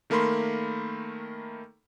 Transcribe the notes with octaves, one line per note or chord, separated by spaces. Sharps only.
D#3 A3 A#3 A#4 B5 C6